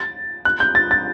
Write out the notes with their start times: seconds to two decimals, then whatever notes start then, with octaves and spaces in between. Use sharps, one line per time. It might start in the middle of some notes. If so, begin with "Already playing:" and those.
Already playing: A6
0.45 F#6
0.60 G6
0.75 A6
0.91 A6